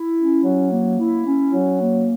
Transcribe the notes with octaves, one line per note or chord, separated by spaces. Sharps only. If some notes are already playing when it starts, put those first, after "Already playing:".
Already playing: E4
C#4
F#3
A#3
E4
C#4
F#3
A#3